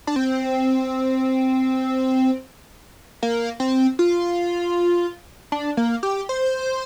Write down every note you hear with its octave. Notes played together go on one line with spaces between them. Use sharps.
D4
C4
A#3
C4
F4
D4
A#3
G4
C5